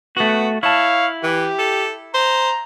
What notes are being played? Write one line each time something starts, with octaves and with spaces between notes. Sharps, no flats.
A3 B3 F#4
E4 C#5 F5 A5
E3 G4
A4
C5 A#5